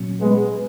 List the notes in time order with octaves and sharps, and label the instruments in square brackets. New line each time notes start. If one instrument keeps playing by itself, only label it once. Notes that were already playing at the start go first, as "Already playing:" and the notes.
Already playing: [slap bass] A#2 F#3 C#4
[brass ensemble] G#3 B3